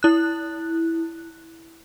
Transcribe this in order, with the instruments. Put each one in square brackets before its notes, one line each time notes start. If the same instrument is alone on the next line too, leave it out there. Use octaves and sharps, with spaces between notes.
[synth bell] E4 F#6